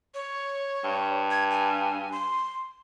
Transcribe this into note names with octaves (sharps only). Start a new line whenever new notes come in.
C#5
G2
G#6
G#5
C6